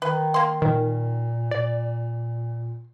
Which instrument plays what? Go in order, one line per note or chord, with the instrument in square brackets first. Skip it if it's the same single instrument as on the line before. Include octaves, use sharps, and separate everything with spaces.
[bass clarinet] D#3 [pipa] B4
[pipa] A#3 C6
[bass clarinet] A#2 [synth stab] D#3
[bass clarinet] A#2 [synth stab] D5